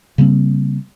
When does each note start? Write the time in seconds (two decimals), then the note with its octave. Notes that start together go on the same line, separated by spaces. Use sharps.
0.18 C#3 G3 A#3 C4